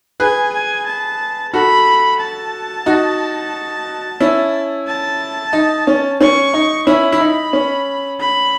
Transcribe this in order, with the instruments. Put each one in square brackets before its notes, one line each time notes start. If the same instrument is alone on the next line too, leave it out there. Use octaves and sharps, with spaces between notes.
[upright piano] G#4 B4 [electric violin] G#5
[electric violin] G#5
A5
[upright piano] F#4 A4 [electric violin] B5
[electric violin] A5
[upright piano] D#4 F#4
C#4 E4
[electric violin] A5
[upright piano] D#4
C#4
[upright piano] C#4 [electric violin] C#6
[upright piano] D#4
[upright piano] C#4 E4 [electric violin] B5
[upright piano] E4
D#4
C#4
[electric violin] B5